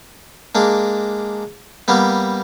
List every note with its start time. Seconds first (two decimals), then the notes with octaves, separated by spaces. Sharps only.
0.55 G#3 A#3 D4
1.88 G3 A#3 B3